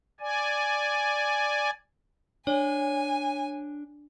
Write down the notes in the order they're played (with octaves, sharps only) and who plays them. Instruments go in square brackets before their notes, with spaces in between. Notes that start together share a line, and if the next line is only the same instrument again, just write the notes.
[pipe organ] D5 G#5
[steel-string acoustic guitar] D4 [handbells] C#5 [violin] G#5